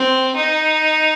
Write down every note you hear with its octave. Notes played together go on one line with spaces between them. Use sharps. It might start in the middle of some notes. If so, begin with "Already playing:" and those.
Already playing: C4
D#4